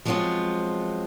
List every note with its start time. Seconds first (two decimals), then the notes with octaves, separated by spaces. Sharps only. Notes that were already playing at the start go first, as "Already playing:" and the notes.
0.05 F3 F#3 G#3 B3 C4 F4